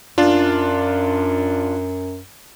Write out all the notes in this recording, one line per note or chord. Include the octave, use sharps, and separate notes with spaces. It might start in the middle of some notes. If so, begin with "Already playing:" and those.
F#2 D4 F4